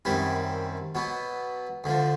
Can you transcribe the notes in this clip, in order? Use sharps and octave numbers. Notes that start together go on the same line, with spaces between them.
F#2 D#3 G3 C4 E4
B2 F#3 B3
D2 D3 F3